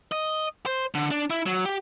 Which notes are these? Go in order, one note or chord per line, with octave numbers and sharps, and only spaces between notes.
D#5
C5
D3
D4
E4
F#3
G4